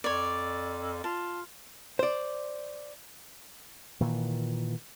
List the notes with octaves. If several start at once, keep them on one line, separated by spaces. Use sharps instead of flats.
F2 C#5 D5
F4 A5
C5 D5
A#2 D#3 E3